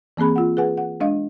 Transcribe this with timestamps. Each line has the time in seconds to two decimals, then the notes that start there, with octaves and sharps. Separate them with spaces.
0.17 E3 A#3 C4 G#4 B5
0.36 F4 F#5
0.57 G#4 B4 F#5 G#5
0.78 F#5
1.00 G#3 D4 D#5 F5